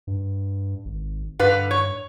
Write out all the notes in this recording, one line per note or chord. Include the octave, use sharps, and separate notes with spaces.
G2
G#1
G2 D3 B4 F5
C#5